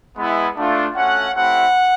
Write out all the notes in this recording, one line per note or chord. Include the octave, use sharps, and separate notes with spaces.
G#3 B3 E4
A3 D4 F4
A3 C#4 F#4 F#5
A3 C4 E4 G4 F#5